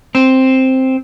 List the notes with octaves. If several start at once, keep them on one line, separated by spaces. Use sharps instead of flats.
C4